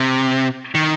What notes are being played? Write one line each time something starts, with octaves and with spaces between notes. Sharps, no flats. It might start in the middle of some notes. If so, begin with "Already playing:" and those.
Already playing: C3
D#3